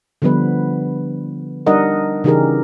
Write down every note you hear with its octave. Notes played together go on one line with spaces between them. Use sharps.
D3 F3 G3 B3 B4
G3 D4 D#4 A#4 D#5 F#5
C#3 E3 D#4 G4 G#4 A#4